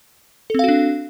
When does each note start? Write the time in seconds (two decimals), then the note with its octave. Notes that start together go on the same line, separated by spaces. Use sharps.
0.50 A4
0.54 C4
0.59 F5
0.64 F#4
0.68 D4